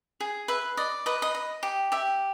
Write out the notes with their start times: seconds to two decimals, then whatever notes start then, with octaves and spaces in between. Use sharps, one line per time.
0.20 G#4
0.48 B4 E5
0.77 D5 D#5
1.06 B4 D#5
1.22 D#5
1.35 D#5
1.63 G4
1.92 G4 E5